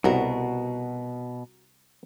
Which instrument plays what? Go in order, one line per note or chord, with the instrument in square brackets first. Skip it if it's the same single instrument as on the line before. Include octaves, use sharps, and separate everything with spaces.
[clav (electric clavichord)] C2 [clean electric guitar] B2 [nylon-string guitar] F#4 A#4